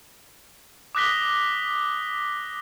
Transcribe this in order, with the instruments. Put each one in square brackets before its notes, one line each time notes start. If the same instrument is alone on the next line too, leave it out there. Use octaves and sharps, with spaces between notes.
[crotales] D6 D#6 F#6 A#6 B6 G7